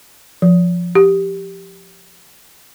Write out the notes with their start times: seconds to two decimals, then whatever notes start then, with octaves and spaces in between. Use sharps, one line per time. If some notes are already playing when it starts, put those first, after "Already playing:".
0.42 F3
0.95 G4